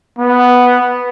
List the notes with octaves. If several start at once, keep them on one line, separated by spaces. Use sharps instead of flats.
B3